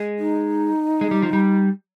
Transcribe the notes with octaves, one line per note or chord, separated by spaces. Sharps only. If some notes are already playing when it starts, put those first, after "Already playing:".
Already playing: G#3
D#4
G#3
G3
F3
G3